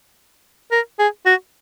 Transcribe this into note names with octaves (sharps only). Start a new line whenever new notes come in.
A#4
G#4
F#4